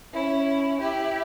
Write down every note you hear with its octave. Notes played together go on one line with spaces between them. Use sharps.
C#4 E4
E4 G4